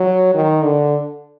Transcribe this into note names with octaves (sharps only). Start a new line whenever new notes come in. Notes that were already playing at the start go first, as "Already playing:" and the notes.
Already playing: F#3
D#3
D3